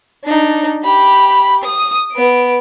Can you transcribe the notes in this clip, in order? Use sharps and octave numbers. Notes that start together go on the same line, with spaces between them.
D4 D#4
G4 B5
D#6
B3 D7